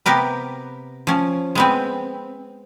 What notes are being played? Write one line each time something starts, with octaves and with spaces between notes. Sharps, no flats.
C3 B3 G4 A#4 B4
F3 C#4
G#3 B3 C4